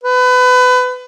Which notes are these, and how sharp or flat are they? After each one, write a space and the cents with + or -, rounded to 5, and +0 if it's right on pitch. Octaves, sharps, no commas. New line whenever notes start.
B4 +25